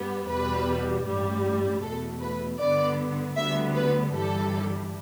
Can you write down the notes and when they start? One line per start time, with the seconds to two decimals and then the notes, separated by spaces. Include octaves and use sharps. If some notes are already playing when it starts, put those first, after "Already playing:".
Already playing: G2 G3 B3
0.28 E2 B2 G3 B4
1.05 A1 G2 G3
1.82 E2 B2 A3 A4
2.21 B4
2.59 G2 D3 B3 D5
3.36 D2 D3 G3 B3 E5
3.75 B4
4.14 G1 G2 E3 G3 A4